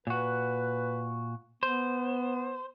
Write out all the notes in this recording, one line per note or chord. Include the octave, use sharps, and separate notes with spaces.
A#2 F#4 B4
B3 C5